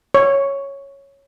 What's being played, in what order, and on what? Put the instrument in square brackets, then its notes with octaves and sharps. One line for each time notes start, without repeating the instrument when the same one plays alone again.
[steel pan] C#5